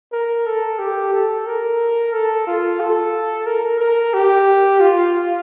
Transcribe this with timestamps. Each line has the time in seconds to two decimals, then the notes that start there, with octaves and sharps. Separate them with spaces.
0.12 A#4
0.46 A4
0.79 G4
1.13 A4
1.47 A#4
2.13 A4
2.47 F4
2.80 A4
3.47 A#4
3.80 A#4
4.14 G4
4.80 F4